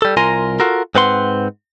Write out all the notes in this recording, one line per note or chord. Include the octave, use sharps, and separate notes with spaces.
G3 A4
C2 F4 A#4 G#5 A#5 C6
F4 F#4 A4 A#4
G#2 C4 B4 F#5 C6